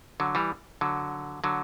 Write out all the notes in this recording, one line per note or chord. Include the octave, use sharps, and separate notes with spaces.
D3 F#3
E3 G3
D3 F#3
D3 F#3